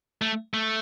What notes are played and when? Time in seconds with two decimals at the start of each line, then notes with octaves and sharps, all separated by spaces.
0.22 A3
0.54 A3